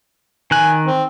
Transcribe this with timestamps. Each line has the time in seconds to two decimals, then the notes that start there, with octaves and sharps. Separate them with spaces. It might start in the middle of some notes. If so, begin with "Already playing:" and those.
0.51 D#3 G#5 F#6
0.86 C4